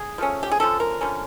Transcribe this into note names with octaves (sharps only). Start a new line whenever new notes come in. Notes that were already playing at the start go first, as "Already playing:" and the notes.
Already playing: G#4
F3 A3 C#4
G4
G#4
D3 F3 A#3 C#4 A4
A#4
D3 F3 A#3 C#4